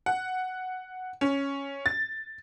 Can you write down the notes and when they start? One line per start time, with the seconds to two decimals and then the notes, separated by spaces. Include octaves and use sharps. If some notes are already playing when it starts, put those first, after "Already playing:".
0.06 F#5
1.21 C#4
1.86 A6